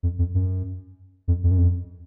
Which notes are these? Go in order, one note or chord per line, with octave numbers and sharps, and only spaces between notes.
F2
F2
F#2
F2
F2
F#2
F2